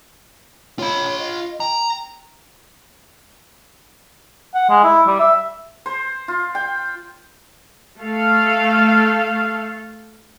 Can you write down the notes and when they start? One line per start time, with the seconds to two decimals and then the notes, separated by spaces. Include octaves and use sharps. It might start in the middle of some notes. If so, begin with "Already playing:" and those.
0.79 F4 C#5 B5
1.19 D#5
1.60 G5 A#5
4.54 F#5
4.70 G#3
4.84 E4
5.07 G3
5.20 E5
5.86 C5
6.28 F4
6.55 G5
8.00 A3 A4 F5